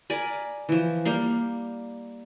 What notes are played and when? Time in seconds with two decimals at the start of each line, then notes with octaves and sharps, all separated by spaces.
0.10 A#4 D5 G#5 B5
0.69 E3 F3
1.05 G3 A#3 F5